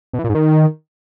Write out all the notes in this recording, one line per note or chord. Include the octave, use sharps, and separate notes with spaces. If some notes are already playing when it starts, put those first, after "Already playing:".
B2
E3
A#2
G#2
D#3